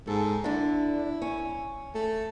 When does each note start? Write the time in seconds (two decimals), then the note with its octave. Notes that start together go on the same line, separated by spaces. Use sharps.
0.07 G#2 A4
0.44 D3 D4 E4
1.22 C#4
1.95 A3